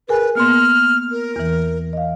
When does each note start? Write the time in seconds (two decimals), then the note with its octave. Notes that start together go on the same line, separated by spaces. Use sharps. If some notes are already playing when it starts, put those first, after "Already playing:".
0.09 G#4 A#4 B4 G#5
0.35 A#3 B3 C6 F6
1.11 A#4
1.36 E2 E3
1.93 D#5 F5